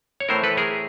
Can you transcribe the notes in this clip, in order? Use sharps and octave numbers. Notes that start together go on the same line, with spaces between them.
C#5
A2 E3 A3 C4 A#4 C5
A4 B4
G#4 A#4